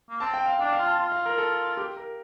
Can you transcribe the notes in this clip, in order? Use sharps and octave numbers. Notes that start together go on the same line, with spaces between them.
A#3
C4 A5
G5
F5
D4 G5
F5
F4
A5
F4
F5
A#4
A4
G4
A#4